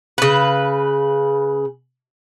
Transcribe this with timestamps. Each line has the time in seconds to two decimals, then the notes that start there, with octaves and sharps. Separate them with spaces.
0.18 C#3 B4